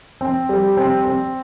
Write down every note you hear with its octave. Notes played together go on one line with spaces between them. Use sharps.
C4
G3
C4
C4